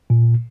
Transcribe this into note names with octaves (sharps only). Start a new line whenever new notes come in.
A#2